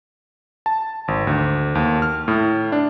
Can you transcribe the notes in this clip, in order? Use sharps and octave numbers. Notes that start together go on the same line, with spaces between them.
A5
G#1
D2
D#2
F6
A2
D4